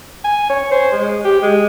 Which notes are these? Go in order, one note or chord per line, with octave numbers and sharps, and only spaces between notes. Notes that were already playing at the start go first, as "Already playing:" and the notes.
G#5
C#5
C5
G#3
G4
G#3